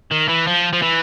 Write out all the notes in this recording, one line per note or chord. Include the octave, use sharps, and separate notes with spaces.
D#3
E3
F3
F3
E3